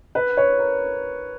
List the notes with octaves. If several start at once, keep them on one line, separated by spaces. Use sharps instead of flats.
B4
C#5
A#4